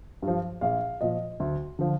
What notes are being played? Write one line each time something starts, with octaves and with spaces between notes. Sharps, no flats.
G2
F3
A#1 F5
A#2 F3 D#5
D2
D3 F3